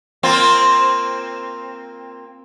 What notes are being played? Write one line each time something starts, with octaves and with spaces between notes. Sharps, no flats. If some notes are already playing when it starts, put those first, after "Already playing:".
A#3 C4 F4